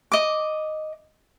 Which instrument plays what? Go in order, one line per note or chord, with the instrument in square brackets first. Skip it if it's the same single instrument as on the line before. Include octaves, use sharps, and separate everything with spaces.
[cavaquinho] D#5 D6